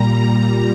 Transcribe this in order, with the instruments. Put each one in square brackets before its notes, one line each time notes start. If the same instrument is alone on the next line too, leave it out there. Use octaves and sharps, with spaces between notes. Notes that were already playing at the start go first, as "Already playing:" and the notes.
Already playing: [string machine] A#2 G3 A#5